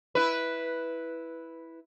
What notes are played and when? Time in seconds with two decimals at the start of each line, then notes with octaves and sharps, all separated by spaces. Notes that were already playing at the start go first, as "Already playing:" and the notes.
0.15 E4 B4